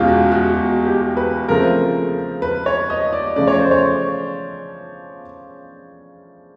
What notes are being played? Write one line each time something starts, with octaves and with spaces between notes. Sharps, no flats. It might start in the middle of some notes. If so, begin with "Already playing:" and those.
Already playing: E2 B2 G#3 C#4 F4 G4
F#4
F#4
F#4
G4
B4
C#3 F3 A3 C4 A#4
B4
C#5
D#5
D5
C#3 F3 A3 C#4 D5
C#5
C5
C#5